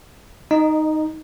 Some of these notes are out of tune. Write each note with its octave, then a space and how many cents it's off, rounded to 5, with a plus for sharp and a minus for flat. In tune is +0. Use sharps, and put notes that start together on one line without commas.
D#4 +0 D#5 -25